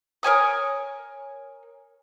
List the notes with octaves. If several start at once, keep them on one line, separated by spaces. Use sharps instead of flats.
A#4 C#5 G#5 D#6